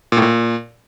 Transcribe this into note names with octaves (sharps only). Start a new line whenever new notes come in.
A#2
A2
A#2